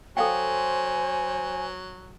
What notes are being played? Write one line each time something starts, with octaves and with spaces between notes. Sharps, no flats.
F#3 A4 C5 F5 G5 G#5